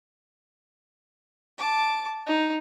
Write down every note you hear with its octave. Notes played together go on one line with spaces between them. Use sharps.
A5 D6
D#4